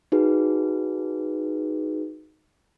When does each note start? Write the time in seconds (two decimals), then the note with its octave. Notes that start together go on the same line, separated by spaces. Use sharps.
0.12 D#4 F#4 G#4 B4